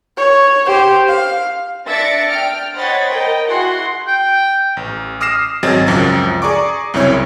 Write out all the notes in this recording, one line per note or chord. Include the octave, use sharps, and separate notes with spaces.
C#5
G4 C5
F5
D4 E5 A6 A#6 C#7 D7
G5 F6 D7
C5 C#5 D#5 F#5 B5 A6
A#4 D#5 G5
E4 F#4 G#4 F#5 C6
G5
A1
D6 D#6 F6 A#6 C7 E7
G#1 F#3 C4 G#4 D#5 A6
C#2 F#2 F3
G#4 D5 A#5 C#6 D6
C2 F#2 C#3 C4 E4 C#5